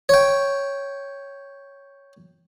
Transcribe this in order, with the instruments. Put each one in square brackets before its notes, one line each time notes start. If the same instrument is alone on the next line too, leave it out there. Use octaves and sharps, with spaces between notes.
[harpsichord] C#5 G5